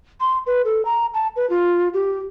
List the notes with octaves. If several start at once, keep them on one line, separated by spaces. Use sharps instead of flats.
C6
B4
A4
A#5
A5
B4
F4
G4